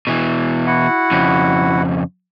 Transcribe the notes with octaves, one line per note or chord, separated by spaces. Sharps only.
B2 E3
E4 F#4 F#5
F2 C#3